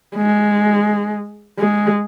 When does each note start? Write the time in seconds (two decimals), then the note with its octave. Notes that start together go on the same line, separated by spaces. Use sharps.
0.16 G#3
1.59 G#3